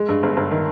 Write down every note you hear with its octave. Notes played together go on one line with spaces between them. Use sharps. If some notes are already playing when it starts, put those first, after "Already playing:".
Already playing: G#3
G2
G1
G1
D#3